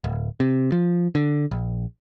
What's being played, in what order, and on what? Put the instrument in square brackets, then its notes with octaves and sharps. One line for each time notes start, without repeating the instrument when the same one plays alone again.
[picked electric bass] D1
C3
F3
D3
A#1